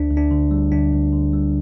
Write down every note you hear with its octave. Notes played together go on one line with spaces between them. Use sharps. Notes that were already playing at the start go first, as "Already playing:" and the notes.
Already playing: D2 D4
D2
D4
D3
G3
D2 D4
D2
D3
G3